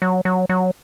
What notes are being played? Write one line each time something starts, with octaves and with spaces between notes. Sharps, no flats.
F#3
F#3
F#3